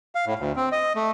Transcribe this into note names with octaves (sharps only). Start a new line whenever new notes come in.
F5
A2
D2
C4
D#5
A3